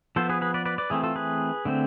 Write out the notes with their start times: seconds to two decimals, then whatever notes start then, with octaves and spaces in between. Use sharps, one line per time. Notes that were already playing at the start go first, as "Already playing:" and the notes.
0.16 F3 B3 A4 C5
0.29 G#4 B4
0.41 G#4 B4
0.54 B4 D5
0.65 B4 D5
0.78 B4 D5
0.90 E3 A3 C4 E4 G#4
1.03 F4 A4
1.16 G#4 B4
1.65 D3 A3 C4